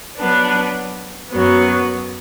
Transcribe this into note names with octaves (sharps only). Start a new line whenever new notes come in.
F#3 B3 D4
F#2 F#3 B3